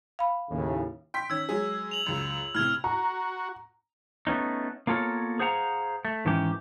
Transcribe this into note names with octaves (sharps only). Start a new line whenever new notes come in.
F5 B5
D#2 A2 C#3
G5 C6 B6
D#3 C#4 E6 G#6
F#3 G#3 G#4
F7 F#7
C#2 F#2
A2 C3 F6 G#6 F7
F#4 A#5
A3 B3 C#4 D#4
A#3 B3 F4 A4 A#4 C#5
G#4 C5 F5 F#5 A5 A#5
A3
G#2 D#3 E3 C#4 G4